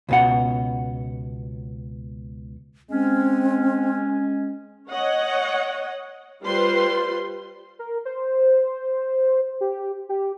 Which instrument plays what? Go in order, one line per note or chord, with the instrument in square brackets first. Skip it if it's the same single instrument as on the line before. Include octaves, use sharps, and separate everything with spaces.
[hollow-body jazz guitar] C#2 B2 F#5
[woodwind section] G#3 C#4 [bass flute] C4
[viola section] C#5 D#5 F#5
G3 F4 B4 C5 C6
[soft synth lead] A#4
C5
G4
G4